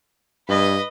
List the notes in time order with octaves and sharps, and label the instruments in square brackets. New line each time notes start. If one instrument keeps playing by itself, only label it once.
[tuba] G2 [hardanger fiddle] B4 D#5